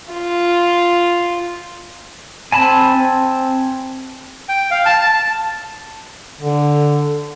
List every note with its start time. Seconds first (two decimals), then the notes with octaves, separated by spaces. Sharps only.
0.13 F4
2.52 C4 G#5 A5 B5
2.96 C4
4.49 G5
4.71 F5
4.86 A5
5.02 A5
6.41 D3